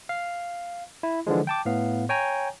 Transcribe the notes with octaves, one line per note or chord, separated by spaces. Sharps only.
F5
E4
D3 E3 F3 G#3
G5 A5 D6
A2 B3 F5
C#5 G5 G#5 A#5